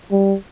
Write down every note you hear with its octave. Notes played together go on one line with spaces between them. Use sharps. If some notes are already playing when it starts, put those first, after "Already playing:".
G3